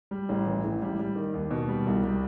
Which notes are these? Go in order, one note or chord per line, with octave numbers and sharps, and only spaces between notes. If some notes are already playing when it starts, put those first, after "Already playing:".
G3
A1
E3
A1
G3
G3
D#3
D#2
B2
G3
C2
G3